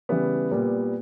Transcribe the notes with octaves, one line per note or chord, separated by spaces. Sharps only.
C#3 E3 G3 B3
A#2 G3 B3